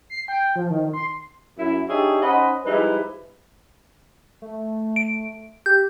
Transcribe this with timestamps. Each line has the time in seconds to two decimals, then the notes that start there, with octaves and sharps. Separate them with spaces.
0.10 C7
0.28 G5
0.56 F3
0.70 D#3
0.93 C6
1.58 F#2 E4
1.89 D4 D#4 G4 G#4 C#5 E5
2.22 C#4 D#4 C5 D#5 F#5 B5
2.65 F3 G3 G#3 D#4 E4 B4
4.42 A3
4.96 D7
5.66 G4 G6